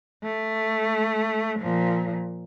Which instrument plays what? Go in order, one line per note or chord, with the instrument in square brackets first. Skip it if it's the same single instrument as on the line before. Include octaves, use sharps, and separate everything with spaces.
[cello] A3
A#2 F3